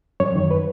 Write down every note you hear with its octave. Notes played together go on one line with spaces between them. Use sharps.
F#2 C#5
D#3
B4